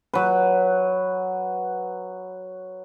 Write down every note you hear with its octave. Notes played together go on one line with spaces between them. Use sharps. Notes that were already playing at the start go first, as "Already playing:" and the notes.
F#3 B4